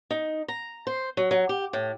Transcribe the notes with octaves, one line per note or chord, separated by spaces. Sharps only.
D#4
A#5
C5
F#3
F#3
G4
A2